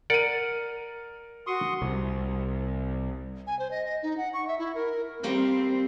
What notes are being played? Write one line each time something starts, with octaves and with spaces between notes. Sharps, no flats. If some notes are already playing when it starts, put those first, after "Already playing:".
A#4 D5 F#5 D#7
F#4 C6 C#6 D#6
C2
G#5
C5
D#5
D#5
D#4
F#5
C#6
E5
E4
A#4
G3 A#3 C4 G5